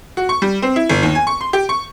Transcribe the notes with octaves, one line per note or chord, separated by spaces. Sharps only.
F#4
C#6
G3
C4
E4
G1
D#2
G#5
C#6
C6
G4
C#6